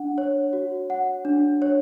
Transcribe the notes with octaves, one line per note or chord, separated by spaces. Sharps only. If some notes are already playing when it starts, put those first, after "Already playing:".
Already playing: D4 F#5
C#5
F#4
F#5
D4
C#5